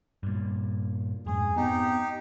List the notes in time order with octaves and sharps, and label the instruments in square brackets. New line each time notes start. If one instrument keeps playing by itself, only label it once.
[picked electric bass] G2 A#2
[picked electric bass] F2 G#2 [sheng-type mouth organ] G#4
[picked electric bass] B3 C4 [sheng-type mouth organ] D#4 G4